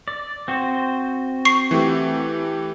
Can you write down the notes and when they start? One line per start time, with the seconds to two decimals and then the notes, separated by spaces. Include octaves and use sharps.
0.08 D5
0.48 C4 F#4 C5
1.45 C#6 C7
1.71 E3 A3 G4